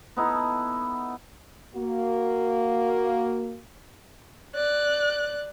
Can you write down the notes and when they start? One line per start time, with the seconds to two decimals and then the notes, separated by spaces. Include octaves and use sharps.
0.17 B3 D#4 E4 A4
1.74 A#3 F#4
4.55 D5 F#6